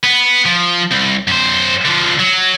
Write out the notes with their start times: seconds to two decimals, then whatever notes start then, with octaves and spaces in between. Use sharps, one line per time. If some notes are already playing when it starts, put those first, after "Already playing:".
0.03 B3
0.45 F3
0.91 C2
1.28 F#2 C5
1.85 D3 F3
2.19 F#3